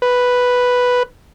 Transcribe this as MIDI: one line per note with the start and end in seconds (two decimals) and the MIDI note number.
0.02 1.03 71